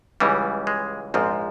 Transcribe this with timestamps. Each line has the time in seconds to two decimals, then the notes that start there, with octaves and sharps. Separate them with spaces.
0.20 C#2 C#3 E3 G3
0.67 G#3
1.14 A#1 G#2 F3 C4